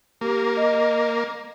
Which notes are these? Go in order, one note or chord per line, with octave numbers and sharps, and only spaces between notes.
A#3 G4
D#5